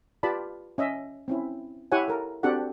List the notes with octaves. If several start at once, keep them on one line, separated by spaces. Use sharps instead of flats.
F4 G4 B4 D5 A5 B5
C#4 D#5 E5
C4 C#4 E4
E4 G4 C#5 F#5 G#5
A4 A#4
C4 D4 F#4 G4 A4 F#5